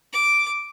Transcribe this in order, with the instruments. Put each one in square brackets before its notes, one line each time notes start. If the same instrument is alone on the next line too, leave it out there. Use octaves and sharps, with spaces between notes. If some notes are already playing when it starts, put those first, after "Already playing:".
[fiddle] D6